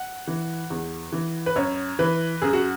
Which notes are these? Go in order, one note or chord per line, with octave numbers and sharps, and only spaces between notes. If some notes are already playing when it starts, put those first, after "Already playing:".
Already playing: F#5
E3
E2
E3
B4
F#2 C#5
E3 B4
F#2 G#4
F#4